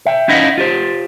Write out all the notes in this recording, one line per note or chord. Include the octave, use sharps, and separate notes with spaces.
E5 G5
C#4 D#4 E4 D#5 F5 F#5
F4 G4 C5